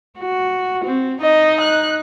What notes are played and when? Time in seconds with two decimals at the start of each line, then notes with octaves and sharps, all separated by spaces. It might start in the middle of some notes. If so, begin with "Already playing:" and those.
0.19 F#4
0.85 C4
1.22 D#4 D#5
1.61 F#6